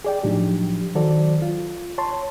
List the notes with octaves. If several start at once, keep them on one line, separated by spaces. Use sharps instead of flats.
G#4 D5 G5
A2 F3 F#3 D4 D#4 G4
D#3 F#3 F#4 A4 C5 D5
F4
C#5 A5 C6